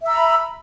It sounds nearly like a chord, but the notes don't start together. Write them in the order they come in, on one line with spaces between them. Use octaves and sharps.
E5 E6 A#5 B5